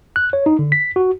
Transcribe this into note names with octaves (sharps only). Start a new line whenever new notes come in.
F#6
C#5
D#4
D3
B6
F#4